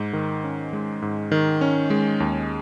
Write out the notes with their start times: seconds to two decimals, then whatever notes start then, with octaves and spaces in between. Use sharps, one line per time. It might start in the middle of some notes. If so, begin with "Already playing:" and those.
Already playing: G#2
0.13 D#3
0.44 C#4
0.73 G#3
1.02 G#2
1.32 D#3
1.61 C#4
1.90 G#3
2.20 D#2